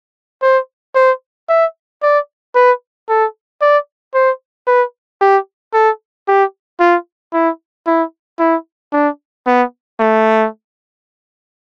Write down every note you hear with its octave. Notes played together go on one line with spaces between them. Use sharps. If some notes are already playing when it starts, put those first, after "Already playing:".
C5
C5
E5
D5
B4
A4
D5
C5
B4
G4
A4
G4
F4
E4
E4
E4
D4
B3
A3